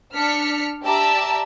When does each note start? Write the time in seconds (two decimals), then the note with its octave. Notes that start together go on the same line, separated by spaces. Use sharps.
0.14 D4 F6 B6 C#7
0.83 G4 D5 E5 A5 A#5 E6